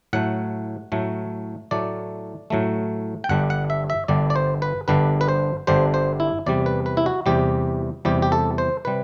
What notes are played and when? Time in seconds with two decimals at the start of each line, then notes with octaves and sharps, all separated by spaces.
0.13 A2 F#3 A3 F#5
0.92 A2 F#3 A3
1.71 A2 F#3 A3 D5
2.50 A2 F#3 A3
3.24 G5
3.29 G1 G2 D3 G3 D4 F#5
3.50 F#5
3.70 E5
3.90 E5
4.08 G1 G2 D3 G3 D4 D5
4.30 D5
4.36 C5
4.62 B4
4.88 G1 G2 D3 G3 D4 B4
5.21 B4
5.28 C5
5.67 G1 G2 D3 G3 D4 C5
5.94 C5
6.20 E4
6.46 E2 C3 G3 D5
6.66 B4
6.86 B4
6.97 E4
7.06 F#4
7.26 E2 C3 G3 G4
8.05 E2 C3 G3 G4
8.22 G4
8.32 A4
8.58 C5
8.85 C3 G3 B4